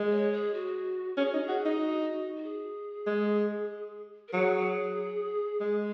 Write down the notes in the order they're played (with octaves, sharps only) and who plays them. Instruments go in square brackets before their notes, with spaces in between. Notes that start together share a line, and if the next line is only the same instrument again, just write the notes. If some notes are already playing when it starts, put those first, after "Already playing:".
Already playing: [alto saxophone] G#3
[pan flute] C#5
G#4
F#4
[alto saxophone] C#4 [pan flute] G#4
[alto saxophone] D#4 [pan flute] F#4
[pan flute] G#4
[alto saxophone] F#4
D#4
[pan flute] F#4
F#4
G#4
[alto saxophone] G#3
[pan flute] A#4
[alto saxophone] F#3 [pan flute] G#4
[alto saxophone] G#3